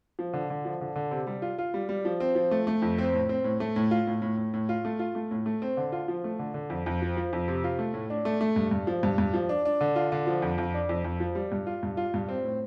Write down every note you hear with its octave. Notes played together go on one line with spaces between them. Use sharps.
F3
D3
D3
F3
D3
D3
C3
G3
F4
F4
G3
G3
F3
C4
F3
A3
A3
F2
C4
A2
C4
A2
A3
A2
F4
A2
A2
A2
A2
F4
A3
F4
A3
A2
A3
C4
D3
F4
F3
A3
D3
D3
F2
F2
F3
F3
F2
C3
F4
A3
A2
D4
A3
A3
G2
G2
F3
G2
G2
F3
D4
D4
D3
F4
D3
F3
F2
F2
D4
F2
F2
F3
G3
G2
F4
G2
F4
G2
C4
A2